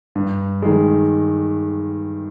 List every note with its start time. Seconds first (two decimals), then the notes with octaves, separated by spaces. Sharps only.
0.15 G2
0.62 D#3 G#3